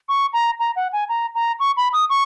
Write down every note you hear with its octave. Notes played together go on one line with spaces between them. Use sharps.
C#6
A#5
A#5
F#5
G#5
A#5
A#5
C#6
B5
D#6
C#6